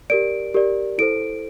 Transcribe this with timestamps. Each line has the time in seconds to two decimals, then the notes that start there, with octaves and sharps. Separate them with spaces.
0.10 G4 A#4 D5 D7
0.54 G4 A#4 D5
0.98 E4 A4 C5 D7